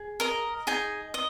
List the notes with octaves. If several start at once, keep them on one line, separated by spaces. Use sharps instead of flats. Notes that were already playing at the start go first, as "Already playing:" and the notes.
Already playing: G#4
A#4 D#5 A#5
D#4 G#4 G#5
D#5